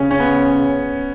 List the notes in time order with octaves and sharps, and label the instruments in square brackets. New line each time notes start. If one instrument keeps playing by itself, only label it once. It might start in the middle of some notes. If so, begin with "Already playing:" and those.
Already playing: [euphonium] C#3 [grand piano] C#4
[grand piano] C#4
B3